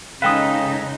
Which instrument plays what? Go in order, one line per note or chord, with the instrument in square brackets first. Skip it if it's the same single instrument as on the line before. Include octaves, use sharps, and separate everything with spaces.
[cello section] C#3 D#4 [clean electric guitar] G#3 A4 B4 [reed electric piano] F5 G5 D#6